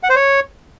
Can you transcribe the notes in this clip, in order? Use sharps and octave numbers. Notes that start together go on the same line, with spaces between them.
F#5
C5
C#5